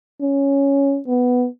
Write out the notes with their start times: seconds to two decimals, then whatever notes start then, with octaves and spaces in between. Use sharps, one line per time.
0.21 C#4
1.08 B3